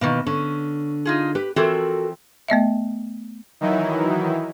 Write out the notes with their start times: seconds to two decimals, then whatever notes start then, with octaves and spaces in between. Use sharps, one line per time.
0.01 B2 D#3 E3 A#3
0.26 D3 C#4
1.05 D#4 F4 G#4
1.35 G4 B4
1.56 E3 F3 C4 F#4 A4 A#4
2.48 A3 B3 D#5 E5
3.61 D#3 E3 F#3 D#4 E4